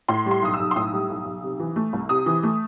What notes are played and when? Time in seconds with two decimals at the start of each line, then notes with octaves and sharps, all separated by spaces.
0.08 A2 C6
0.26 G3
0.31 C6
0.42 B1 D#6
0.54 E6
0.59 B1
0.71 C6
0.76 A2 D#6
0.93 G3
1.10 B1
1.25 B1
1.43 C3
1.59 E3
1.76 A3
1.93 C2
2.09 C3 D#6
2.26 E3
2.43 A3